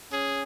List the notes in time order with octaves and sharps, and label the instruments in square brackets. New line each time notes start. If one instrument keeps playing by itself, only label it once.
[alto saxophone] C#4 [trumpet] G#4